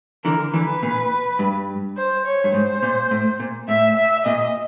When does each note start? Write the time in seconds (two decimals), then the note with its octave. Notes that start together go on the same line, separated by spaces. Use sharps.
0.24 D3 E3 A#4
0.53 D3 E3 B4
0.83 A#2
1.39 G2
1.97 C5
2.26 C#5
2.44 G2
2.53 G#2 C5
2.83 A#2
3.11 A2
3.40 A#2
3.68 A2 E5
3.97 E5
4.25 A#2 D#5